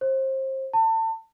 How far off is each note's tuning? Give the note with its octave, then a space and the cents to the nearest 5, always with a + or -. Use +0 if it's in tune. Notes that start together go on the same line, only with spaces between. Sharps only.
C5 +30
A5 +30